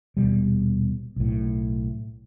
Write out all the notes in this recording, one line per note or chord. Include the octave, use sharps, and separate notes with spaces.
D#1 B2 G3
B1 A2